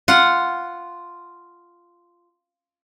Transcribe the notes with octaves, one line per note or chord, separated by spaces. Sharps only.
F4 F#5